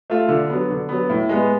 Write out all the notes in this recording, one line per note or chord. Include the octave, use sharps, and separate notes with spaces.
A3 F4
D3
F#3 B3
D3
F#3 B3
A2
G#3 B3